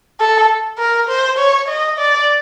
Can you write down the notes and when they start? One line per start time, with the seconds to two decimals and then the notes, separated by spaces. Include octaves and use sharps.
0.20 A4
0.78 A#4
1.08 C5
1.38 C#5
1.68 D#5
1.98 D5